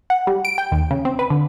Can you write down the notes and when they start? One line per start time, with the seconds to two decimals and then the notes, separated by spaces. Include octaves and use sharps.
0.10 F#5
0.27 G3
0.45 D7
0.58 G5
0.72 D#2
0.91 C#3
1.05 C4
1.19 B4
1.30 D3